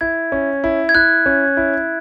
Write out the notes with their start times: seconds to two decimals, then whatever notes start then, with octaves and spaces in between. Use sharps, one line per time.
0.01 E4 G#6
0.32 C#4
0.64 E4
0.89 G#6
0.95 E4 F#6
1.26 C#4
1.57 E4